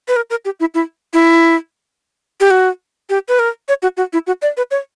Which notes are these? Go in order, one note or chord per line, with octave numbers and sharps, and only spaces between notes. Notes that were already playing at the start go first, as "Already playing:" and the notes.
B4
A#4
A#4
G4
E4
E4
E4
G4
F#4
G4
B4
A#4
C#5
F#4
F#4
E4
F#4
D5
B4
C#5